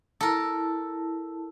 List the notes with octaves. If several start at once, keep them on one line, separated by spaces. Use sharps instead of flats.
E4 A4 A#4 A5